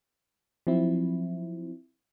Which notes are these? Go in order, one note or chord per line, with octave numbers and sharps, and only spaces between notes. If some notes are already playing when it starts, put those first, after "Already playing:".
F3 F#3 C4 E4